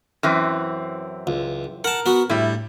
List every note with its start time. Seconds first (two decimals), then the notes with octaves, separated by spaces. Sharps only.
0.23 F#2 E3 C4
1.27 C#2
1.84 A#4 F#5 A5
2.06 B3 F#4
2.30 A2 G3 E4